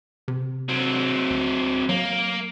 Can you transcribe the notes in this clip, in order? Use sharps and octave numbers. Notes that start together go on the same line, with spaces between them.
C3
F#3 C4
D2
F#3 A#3